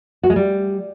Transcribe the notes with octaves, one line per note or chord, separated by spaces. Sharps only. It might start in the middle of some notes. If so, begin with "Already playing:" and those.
F#4
G#3
G3